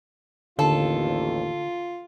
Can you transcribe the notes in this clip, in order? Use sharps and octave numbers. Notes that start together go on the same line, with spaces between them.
A1 D#2 D3 F4 A4